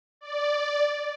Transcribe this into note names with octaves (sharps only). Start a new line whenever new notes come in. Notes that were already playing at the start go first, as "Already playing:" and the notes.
D5